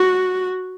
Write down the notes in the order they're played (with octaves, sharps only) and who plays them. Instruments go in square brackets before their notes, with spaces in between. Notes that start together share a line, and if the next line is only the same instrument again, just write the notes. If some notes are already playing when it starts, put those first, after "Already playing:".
Already playing: [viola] F#4